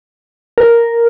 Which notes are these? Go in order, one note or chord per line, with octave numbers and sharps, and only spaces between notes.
A#4